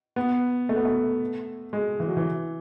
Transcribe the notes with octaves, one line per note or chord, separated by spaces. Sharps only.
B3
A3
B3
A3
G#3
E3
F#3
E3